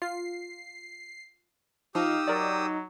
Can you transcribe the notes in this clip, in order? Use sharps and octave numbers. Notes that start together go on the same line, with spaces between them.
F4 C7
F3 D#4 G4 F5 D#6 E6
F#3 A#4 D5